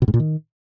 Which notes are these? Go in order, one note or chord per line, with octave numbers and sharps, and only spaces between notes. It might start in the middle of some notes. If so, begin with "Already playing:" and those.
B2
G#2
A#2
D#3